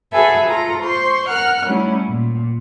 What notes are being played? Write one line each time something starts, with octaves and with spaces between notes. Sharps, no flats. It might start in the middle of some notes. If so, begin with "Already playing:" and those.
F#4 G#4 A4 B4 E5 G#5
F4 A4 A#5
C5 C6 C#6
A#4 F#5 F6 F#6
F#3 G3 A3 C#4 E4
A#2